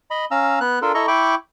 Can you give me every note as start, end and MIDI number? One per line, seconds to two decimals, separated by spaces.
0.11 0.25 75
0.11 0.25 83
0.31 0.59 61
0.31 0.59 77
0.31 0.59 82
0.31 0.59 88
0.60 0.79 59
0.60 0.79 90
0.82 0.92 62
0.82 0.92 65
0.82 0.92 69
0.82 0.92 70
0.94 1.06 64
0.94 1.06 69
0.94 1.06 75
0.94 1.06 82
0.94 1.06 85
1.08 1.35 64
1.08 1.35 79
1.08 1.35 83
1.08 1.35 85
1.08 1.35 86